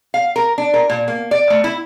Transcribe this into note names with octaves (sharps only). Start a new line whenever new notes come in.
F5
A#4
D4
A#4
A#2
A#3
D5
A3
E4